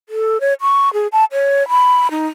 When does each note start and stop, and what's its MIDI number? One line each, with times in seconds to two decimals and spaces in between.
0.09 0.41 69
0.41 0.54 73
0.61 0.92 85
0.93 1.07 68
1.12 1.25 81
1.32 1.67 73
1.69 2.11 83
2.11 2.27 63